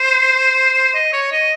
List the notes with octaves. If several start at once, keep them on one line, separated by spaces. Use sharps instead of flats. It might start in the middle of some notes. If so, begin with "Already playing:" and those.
Already playing: C5
D#5
C#5
D#5